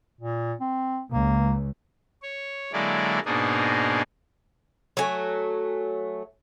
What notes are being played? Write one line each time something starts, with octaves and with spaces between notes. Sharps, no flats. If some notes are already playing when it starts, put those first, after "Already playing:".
A#2
C4
C#2 A#3
C#5
D3 F#3 G#3 A#3 E4 D5
G#2 B2 A#3 D4 D#4 G#4
F#3 A3 G#5